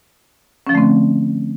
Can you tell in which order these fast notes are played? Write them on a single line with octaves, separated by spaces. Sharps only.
C#4 F3 D3 A3 C4